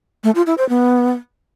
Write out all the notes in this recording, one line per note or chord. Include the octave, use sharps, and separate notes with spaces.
A3
F4
E4
C5
B3